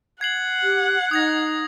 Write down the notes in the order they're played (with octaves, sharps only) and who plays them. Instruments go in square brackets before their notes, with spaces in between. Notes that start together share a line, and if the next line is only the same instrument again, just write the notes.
[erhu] F#5 [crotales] G#6 C7 F#7
[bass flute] G4
[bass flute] D#4 [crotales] D#6 G#6 A#6